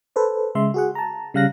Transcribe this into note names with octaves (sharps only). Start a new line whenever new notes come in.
A4 B4 C5
C#3 G#3 E5 C6
F#4 G#4 F#5
A5 A#5
C#3 G3 F5 F#6 A#6